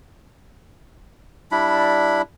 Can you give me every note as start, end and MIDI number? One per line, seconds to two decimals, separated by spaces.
1.51 2.22 55
1.51 2.22 62
1.51 2.22 64
1.51 2.22 83